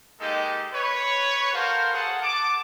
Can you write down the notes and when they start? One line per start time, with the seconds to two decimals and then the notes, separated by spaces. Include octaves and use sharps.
0.20 G#3 A#3 D#4 G4 A4
0.73 B4 C#5
1.53 F#4 A4 A#4 C5 F5
1.93 G#4 A4 F#5
2.22 A5 D6